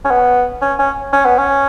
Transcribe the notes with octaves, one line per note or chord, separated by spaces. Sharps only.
C#4
B3
C#4
C#4
C#4
B3
C#4